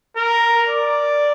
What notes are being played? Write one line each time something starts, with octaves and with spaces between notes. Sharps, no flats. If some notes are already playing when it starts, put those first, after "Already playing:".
A#4
D5